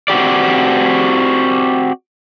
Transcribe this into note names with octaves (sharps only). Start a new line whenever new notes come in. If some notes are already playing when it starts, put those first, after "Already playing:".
C4 F#4 G4 D5